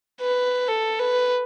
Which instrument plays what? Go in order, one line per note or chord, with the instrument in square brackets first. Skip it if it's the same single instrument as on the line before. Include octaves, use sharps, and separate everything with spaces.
[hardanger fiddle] B4
A4
B4